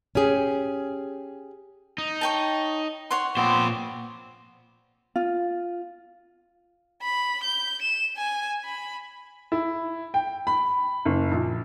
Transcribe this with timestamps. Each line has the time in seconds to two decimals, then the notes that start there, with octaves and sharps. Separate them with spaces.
0.15 C#4 G4 G#4
1.98 D#4
2.21 C#5 G5 A5
3.11 C#5 F#5 C6
3.37 A#2 B3 C4 C5 D6
5.16 F4
7.02 B5
7.43 G6
7.82 E7
8.17 G#5
8.65 B5
9.52 E4
10.14 G5
10.47 B5
11.05 F#1
11.32 A#1